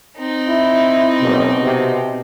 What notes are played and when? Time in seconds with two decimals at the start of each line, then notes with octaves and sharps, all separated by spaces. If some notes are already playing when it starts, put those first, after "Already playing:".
0.18 C4 D#4
0.48 E4
1.22 F#1 B2
1.63 C3